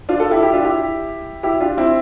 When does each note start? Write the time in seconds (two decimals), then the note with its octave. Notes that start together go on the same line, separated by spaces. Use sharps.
0.09 D4 F4
0.20 F4 A4
0.31 E4 G4
0.43 E4 G4
0.54 D4 F4
0.65 E4 G4
1.43 E4 G4
1.61 D4 F4
1.77 C4 E4